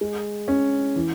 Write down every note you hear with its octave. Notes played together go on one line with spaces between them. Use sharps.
G#3
C#4
E3